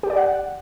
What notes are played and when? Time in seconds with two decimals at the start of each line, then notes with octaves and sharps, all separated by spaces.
0.03 G4
0.10 D5
0.17 F#5